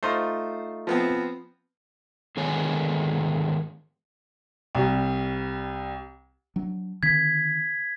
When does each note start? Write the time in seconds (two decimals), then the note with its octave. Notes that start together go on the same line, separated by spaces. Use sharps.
0.03 A3 D#4 F4 C5
0.87 F3 B3 C4
2.37 D3 D#3 G#3 B3 C#5 G#5
4.75 C2 G3
6.56 F#3 D4
7.03 D3 D#3 C4 G#6 B6